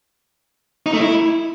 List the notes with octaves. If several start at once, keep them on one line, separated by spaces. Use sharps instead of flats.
D#4
A3
E4